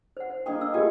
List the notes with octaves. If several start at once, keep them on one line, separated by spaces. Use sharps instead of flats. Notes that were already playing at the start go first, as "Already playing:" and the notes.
C5 F#5
C5
A#3 D4 G#4 D#5 G5
E6
A3 F4 G4 G#4 G#5 C#6